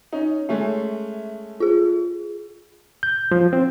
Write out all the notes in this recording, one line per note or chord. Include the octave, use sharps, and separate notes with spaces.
C#4 D#4
G#3 A3 C#4 E5
F4 G#4
G6
F3
C4